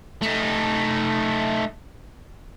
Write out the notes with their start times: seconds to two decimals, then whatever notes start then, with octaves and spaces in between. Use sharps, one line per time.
0.22 A3 D#4